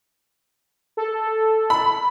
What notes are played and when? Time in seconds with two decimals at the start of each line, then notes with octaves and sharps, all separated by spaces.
0.97 A4
1.70 B5